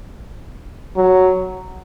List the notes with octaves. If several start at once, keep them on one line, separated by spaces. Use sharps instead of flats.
F#3